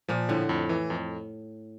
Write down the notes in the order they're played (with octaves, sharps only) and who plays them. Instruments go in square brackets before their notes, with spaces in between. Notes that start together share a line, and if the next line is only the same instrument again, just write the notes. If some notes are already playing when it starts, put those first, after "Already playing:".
[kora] A#2 [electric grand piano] F3
[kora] A2 [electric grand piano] D3
[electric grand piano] F2
E3
F2